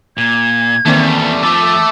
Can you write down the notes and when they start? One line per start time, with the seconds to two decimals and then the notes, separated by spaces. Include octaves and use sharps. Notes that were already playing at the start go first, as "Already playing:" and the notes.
0.17 A#2 G#6
0.85 E2 D#3 G3 A3 A#3 C4
1.43 F2 F3 A3 A4 D6